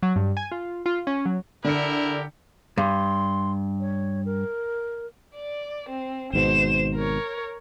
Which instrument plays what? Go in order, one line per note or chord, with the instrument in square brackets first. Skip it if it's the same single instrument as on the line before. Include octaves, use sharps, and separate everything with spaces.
[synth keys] F#3
G2
G#5
F4
F4
C#4
F#3
[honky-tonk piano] D3 C#7 [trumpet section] E4 G4 A#4
[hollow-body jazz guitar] G2 [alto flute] C6
[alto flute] C#5
A#4
[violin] D5
C4
[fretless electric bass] G#1 G#2 B2 [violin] C5 E7
[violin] A#4 C#5